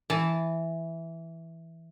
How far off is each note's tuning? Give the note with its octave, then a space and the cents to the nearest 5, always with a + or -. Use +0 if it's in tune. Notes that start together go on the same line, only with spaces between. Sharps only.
E3 +0 A5 -10